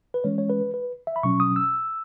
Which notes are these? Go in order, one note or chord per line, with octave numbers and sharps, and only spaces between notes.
B4
E3 G#3 C#4 C#5
C#5
B4
B4
E5
B5
B2 F#3 C#4 C#6
D#6
E6